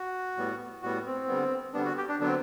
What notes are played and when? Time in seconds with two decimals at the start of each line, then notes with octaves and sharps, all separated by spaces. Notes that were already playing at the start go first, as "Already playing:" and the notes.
Already playing: F#4
0.37 A2 G3 B3
0.82 A2 G3 B3 F#4
1.06 C4
1.28 D3 G3 B3
1.74 D3 G3 B3 D4
1.85 F#4
1.97 G4
2.09 D4
2.19 D3 F#3 B3 D4
2.27 C4